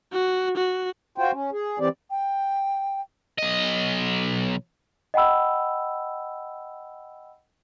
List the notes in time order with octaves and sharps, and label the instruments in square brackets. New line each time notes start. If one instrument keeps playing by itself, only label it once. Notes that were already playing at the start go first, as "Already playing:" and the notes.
[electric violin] F#4
F#4
[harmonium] F4 F#4 C5 G5
C#4
G#4
E3 C4 G4 D5
[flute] G5
[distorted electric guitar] B1 D#5
[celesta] D#5 F#5 G5 B5 E6